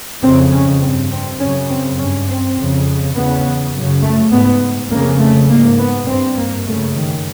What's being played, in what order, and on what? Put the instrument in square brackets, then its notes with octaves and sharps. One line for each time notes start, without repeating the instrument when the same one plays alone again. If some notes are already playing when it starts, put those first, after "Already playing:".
[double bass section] F2 C#3 C4
C#4
G2 C4
C4
F#2 C#3 C#4
C4
G2 C#4
C4
F2 C#3
E2 C#3 B3
F#2 C#3
A3
G#2 B3
F2 C#3 A#3
A3
G#2 A#3
B3
G2 C4
A#3
F#2 C#3 A3
D#3